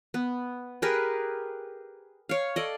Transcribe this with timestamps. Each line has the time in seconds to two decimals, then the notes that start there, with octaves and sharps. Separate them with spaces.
0.14 B3
0.82 G4 G#4 A#4 B4
2.29 C#5 F5
2.56 A4 D5 D#5